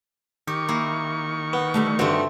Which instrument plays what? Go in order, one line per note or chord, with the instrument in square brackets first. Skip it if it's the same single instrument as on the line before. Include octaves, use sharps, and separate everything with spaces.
[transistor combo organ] D#3 C#6 [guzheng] G4
[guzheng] A#3 E4
[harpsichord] B3
[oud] D3 G3 A3
[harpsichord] G2 D3 [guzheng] A3 C4 [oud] F#4 G4